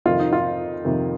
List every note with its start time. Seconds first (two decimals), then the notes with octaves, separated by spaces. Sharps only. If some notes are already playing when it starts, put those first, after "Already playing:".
0.06 F2 C3 D#3 F4
0.19 D#4
0.33 F4
0.84 F2 C3 D#3